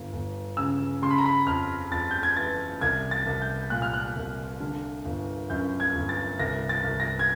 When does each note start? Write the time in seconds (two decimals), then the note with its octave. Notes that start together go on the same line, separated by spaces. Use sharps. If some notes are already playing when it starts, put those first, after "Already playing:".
Already playing: G1
0.13 G1
0.57 C#3 E6
1.02 C#3 C6
1.10 B5
1.18 A#5
1.26 B5
1.46 F2 F6
1.92 F2 A6
2.11 G6
2.23 G#6
2.37 E3 A6
2.81 C2 G#6
3.11 A6
3.26 C2
3.42 G6
3.70 A#2 F#6
3.82 F6
3.94 F#6
4.16 C2
4.60 D3
5.05 G1
5.50 F#2 G6
5.80 G#6
5.94 G1
6.09 A6
6.39 C2 A#6
6.69 A6
6.84 C2
7.00 A#6
7.19 G#6